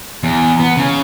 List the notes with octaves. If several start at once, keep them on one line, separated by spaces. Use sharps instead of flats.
E2
B3
C#3